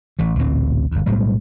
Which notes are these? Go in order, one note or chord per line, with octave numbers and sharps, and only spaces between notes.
A1 E3
A1 D2 A#2 C4
G1 D#2
B1 A2 G3 G#3